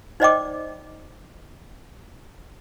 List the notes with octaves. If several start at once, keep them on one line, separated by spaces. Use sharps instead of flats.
D#4 C5 D5 D#5 G5 D6